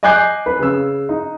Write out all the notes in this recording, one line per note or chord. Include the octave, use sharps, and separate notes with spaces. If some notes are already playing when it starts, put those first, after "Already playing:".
D#5 G#5 D6 F#6 G6 C7
B4
C#3 E6
D#4